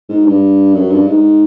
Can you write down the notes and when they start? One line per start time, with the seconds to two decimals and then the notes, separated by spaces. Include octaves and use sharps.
0.09 G#2
0.26 G2
0.74 F#2
0.91 G2
1.07 G#2